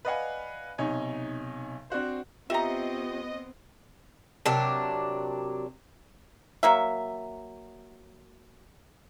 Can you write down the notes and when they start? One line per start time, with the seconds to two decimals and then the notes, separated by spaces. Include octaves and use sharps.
0.05 B4 D5 D#5 F5 F#5 G#5
0.78 B1 C3 D#4 C#5 G#5
1.90 C4 D4 F#4 C5
2.50 B3 C4 F4 G4 D#5 E5 G5 A#5
4.46 C3 F#3 D4 A#4
6.63 F#3 A#3 E5